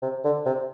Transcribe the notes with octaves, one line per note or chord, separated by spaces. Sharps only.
C3
D3
C3